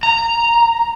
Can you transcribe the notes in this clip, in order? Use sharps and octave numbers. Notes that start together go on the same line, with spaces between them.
A#5